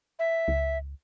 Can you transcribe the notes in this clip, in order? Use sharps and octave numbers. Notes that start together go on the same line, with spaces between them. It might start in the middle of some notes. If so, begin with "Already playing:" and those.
E5
C#2